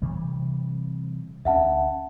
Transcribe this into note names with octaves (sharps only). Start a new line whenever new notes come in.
C3 E3 G3
D2 C#4 E5 F#5 A5